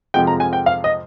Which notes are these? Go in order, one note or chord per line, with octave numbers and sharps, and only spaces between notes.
F2 C3 F3 G#3 G5
A#5
G#5
G5
F5
D#5